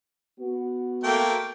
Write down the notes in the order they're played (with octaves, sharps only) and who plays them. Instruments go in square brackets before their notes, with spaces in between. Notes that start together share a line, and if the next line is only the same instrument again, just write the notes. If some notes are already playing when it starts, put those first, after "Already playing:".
[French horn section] B3 F#4
[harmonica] A3 A#3 G5